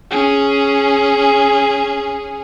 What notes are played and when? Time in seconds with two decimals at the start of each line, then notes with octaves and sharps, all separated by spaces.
0.11 C#4 G#4